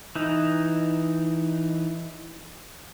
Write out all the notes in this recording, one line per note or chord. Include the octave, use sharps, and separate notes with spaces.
E3 D#4